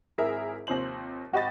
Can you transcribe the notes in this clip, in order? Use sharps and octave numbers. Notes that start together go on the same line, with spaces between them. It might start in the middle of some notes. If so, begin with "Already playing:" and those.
G#1 E4 G#4 A#4 E5
D#2 C3 F3 C5 F#7
G#1 F#4 G4 D#5 B5 A6